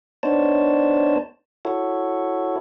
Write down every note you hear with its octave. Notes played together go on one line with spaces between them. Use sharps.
B3 D4 D#4 C5 C#5 A5
E4 F#4 A4 C#5